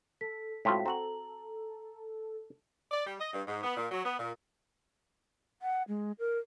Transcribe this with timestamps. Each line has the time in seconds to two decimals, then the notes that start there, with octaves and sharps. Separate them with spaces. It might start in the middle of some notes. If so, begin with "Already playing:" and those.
0.21 A4 B6
0.65 A2 G#3 C4 F4 F#4 G5 B6
0.86 C4 F#4 A4 A#5 F#7
2.92 D5
3.07 G3
3.20 D#5
3.33 G2
3.48 G#2
3.63 B3
3.77 A#2
3.91 F#3
4.05 B3
4.19 A#2
5.62 F#5
5.88 G#3
6.19 A#4